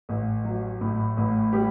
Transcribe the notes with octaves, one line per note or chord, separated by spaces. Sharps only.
A1
F#3
A2
A1
G3 G4